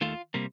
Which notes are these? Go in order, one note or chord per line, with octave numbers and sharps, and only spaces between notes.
D#2 D#3 A3 F4
C3 G3 A#3